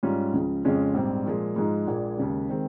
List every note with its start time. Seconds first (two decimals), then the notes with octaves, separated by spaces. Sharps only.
0.03 G#2 G3 C#4 F4
0.33 C#2 C#3 F3
0.65 F2 C#3 G#3 C#4 F4
0.94 A#1 G#2 G3 C4
1.26 A#2 F3 G#3
1.56 G#2 F3 G#3 D#4
1.87 A#1 A#2 G#3
2.18 D#2 C#3 G#3
2.49 D#3 G#3 C4